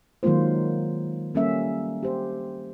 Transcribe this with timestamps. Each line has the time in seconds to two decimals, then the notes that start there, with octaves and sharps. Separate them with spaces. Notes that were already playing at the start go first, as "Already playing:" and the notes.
0.23 D#3 F#3 G#3 A#3 F4 C5
1.35 G3 A#3 C#4 A4 E5
2.03 G4 C5